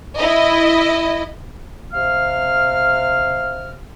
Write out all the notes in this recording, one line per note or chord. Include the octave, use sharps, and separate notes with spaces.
E4 D#5
C3 F5 F6